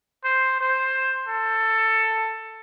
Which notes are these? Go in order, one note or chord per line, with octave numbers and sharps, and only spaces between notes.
C5
C5
A4